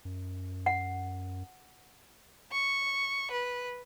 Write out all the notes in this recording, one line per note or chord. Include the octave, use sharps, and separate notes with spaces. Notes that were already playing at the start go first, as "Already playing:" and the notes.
F#2
F#5
C#6
B4